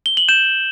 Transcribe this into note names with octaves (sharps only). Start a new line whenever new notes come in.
G7
F#7
G6 E7